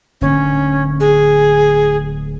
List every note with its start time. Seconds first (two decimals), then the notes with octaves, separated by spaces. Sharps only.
0.21 D1 D3 A#3 C#4
1.00 G#4